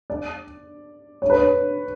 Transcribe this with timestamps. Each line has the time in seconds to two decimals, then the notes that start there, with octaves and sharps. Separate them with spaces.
0.10 D5
1.22 C#5
1.30 B4
1.36 C#5